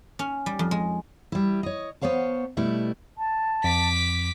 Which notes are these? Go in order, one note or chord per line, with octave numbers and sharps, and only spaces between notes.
C#4
G3
F2
G#3
G3 E4
C#5 D#5
B3 C5 C#5 F5 A5
B2 G3 A3 E4 B4
A5
F2 D6 B6